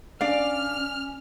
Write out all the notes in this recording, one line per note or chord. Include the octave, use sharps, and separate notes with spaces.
C#4 D4 D5 F5 F6